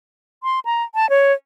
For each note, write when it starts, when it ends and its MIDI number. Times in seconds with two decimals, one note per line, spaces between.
0.43 0.60 84
0.65 0.83 82
0.95 1.09 81
1.10 1.33 73